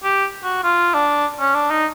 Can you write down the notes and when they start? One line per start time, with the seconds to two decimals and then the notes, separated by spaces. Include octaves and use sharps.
0.04 G4
0.44 F#4
0.64 F4
0.95 D4
1.40 C#4
1.55 D4
1.70 D#4